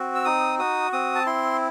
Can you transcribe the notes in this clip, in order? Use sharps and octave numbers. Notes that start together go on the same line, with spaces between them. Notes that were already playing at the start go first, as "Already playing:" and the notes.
Already playing: C4 F#4
E6
D#4 D#6
F#4 D#6
C4 D#6
A5
E4 C6